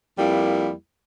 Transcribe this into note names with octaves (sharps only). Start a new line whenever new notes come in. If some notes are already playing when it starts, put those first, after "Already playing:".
F2 G3 A#3 E4